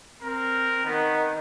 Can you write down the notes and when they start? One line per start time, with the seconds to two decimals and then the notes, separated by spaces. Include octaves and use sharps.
0.22 C4 A#4
0.86 D#3 B3